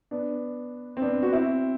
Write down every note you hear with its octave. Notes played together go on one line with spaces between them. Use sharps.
B3 D4
C4
B3 D4
F#4
C4 E4